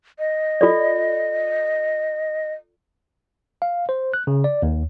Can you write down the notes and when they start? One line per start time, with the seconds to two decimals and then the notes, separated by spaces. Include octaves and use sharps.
0.19 D#5
0.61 F4 A4 D5
3.62 F5
3.89 C5
4.14 F#6
4.27 C#3
4.44 D5
4.62 D#2